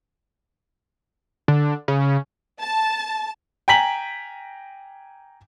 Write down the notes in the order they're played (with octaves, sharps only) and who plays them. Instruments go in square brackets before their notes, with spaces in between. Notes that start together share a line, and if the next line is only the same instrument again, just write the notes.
[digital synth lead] D3
C#3
[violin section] A5
[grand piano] G5 G#5 A#5 B6 F#7